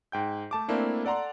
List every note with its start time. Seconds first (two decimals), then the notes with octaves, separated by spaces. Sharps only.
0.12 G#2 G5 G6
0.51 A3 A5 D6
0.68 A3 A#3 C4 D4 E4
1.05 A4 D5 F#5 A#5 C6